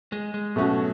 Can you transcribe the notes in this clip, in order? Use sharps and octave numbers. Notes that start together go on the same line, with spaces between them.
G#3
G#3
B2 F#3 A3 C#4 F#4